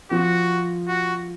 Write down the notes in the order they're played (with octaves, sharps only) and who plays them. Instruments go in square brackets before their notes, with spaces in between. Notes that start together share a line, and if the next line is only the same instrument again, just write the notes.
[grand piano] F3 [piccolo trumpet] F#4
[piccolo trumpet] F#4